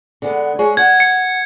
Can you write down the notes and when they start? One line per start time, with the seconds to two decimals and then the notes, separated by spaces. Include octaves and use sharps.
0.22 D3 G#3 B3
0.59 G#3 G#4 C#5
0.77 F#5 G#6
1.00 C#7